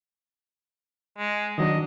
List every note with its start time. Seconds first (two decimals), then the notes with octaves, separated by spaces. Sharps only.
1.18 G#3
1.58 D#3 F#3 D4 D#5